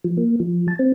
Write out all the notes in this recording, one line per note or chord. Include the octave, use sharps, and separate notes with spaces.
F3
A#3
F3
A5
C4